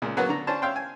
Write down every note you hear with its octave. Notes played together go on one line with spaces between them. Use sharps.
C#2 A#2
F#3 A#3 B3 F#4 B4 F#6
D3 A#5
C#4 D4 C5 A5
C#5 E5 F5 G5 C6
G#5